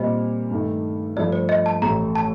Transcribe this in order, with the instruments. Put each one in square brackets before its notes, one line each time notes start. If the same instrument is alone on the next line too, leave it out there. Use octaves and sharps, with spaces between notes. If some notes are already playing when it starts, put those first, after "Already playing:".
Already playing: [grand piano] A#2 G3 C4 [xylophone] D#5
[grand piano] G2 D#3 A3
[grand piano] G2 F3 A3 [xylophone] D5
[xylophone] C5
D#5
A5
[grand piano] A1 A2 A3 [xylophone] A#5
[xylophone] A5